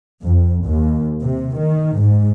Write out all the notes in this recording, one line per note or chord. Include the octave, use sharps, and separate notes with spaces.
F2
D#2
C3
D#3
G#2